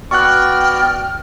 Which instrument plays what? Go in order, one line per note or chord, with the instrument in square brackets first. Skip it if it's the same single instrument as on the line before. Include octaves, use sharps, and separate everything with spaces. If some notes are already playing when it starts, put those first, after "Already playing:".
[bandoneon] B3 F#4 D5 [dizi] G5 [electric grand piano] C#6 F#6 [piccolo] F6